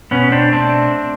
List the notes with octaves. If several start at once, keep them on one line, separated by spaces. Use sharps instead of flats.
B2 B3 C#4
C4 D4
A3 C4 D4